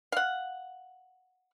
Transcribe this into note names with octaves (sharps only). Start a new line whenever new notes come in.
F5 F#5